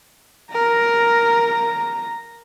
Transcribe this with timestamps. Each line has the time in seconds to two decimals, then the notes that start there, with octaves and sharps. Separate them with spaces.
0.53 A#4 A#5